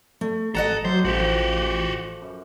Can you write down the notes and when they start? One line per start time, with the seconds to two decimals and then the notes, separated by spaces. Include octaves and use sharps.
0.21 A3
0.55 G#1 A4 D#5 F#5 A#5
0.85 F#3 G4 A4 C5 G5
1.05 A1 F3 F#4 G4
2.22 F#2